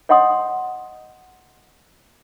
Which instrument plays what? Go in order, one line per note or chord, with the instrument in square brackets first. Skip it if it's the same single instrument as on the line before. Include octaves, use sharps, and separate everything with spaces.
[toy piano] C#5 D#5 F#5 C6 D#6